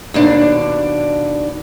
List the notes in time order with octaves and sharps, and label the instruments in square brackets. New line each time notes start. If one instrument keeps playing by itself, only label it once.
[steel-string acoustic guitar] D#2 B2 D4